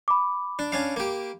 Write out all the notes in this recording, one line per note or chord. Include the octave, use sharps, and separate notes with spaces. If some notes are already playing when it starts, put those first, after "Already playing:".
B5 D6
D4
C#4 D4 F5
A#3 G4